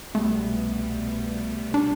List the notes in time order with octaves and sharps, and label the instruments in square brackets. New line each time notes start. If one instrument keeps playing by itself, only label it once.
[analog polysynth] C2 B2 G3 B3 [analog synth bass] A3
[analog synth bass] D4